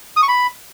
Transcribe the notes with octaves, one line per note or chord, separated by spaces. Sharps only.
D#6
C#6
B5